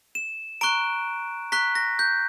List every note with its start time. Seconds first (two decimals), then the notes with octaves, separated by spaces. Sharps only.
0.15 E7
0.61 A#5 C#6 F#6 D7
1.52 A#5 C#6 F#6 B6
1.75 A#6
1.99 G6